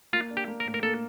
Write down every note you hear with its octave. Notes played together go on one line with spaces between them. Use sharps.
A#3 F4
D4
G4
A#3
A#4
A2
A#4
A#3 A4